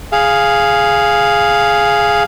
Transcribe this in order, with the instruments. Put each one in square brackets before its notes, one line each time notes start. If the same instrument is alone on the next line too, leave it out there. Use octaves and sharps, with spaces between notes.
[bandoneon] G#4 F5